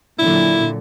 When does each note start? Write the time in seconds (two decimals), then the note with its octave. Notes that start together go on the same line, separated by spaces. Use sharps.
0.19 A#2 D3 F#3 E4